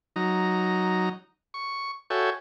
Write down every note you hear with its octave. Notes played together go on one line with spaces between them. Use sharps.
F#3 D#4 A#5
C#6
F#4 A4 C#5 E5 G5 G#5